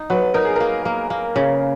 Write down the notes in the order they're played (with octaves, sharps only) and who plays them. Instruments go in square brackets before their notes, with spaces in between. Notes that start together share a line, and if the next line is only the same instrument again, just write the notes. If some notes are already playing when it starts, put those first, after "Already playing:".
Already playing: [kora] D#4
[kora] F#3 [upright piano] B4
[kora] D#4 [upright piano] A#4
[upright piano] G#4
[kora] A#3 [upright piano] A#4
[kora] A#3
A#3
C#3